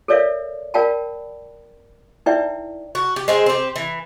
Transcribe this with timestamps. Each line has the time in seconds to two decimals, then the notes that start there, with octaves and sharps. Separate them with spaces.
0.08 A4 A#4 C#5 D5 E5 F5
0.74 A#4 D5 F5 G5 A5 B5
2.26 D#4 E4 B4 D5 E5 G5
2.95 F#4
3.16 G4
3.28 G#3 C4 G#4
3.46 C4 G4
3.76 E3